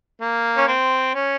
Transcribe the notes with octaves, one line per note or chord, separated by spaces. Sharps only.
A#3
C#4
C4
C#4